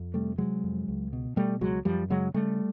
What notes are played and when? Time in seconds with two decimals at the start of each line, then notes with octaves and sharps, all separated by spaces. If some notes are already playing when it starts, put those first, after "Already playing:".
Already playing: F2
0.14 C3 G3 A3
0.38 C3 F#3 G#3
0.64 F2
0.88 C#2
1.13 B2
1.36 B2 G3 A3
1.61 C#2 F#3 G#3
1.85 F#2 F3 G3
2.10 C#3 F#3 G#3
2.34 C#3 G3 A3